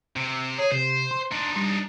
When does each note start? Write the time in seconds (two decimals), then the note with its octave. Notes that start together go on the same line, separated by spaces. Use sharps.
0.16 C3
0.58 G#4 C#5
0.72 C3 C5
1.11 C6
1.31 D4 D#4
1.56 G3